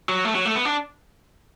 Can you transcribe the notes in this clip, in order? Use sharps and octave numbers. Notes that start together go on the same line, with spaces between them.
F#3
A3
F#3
A3
B3
D4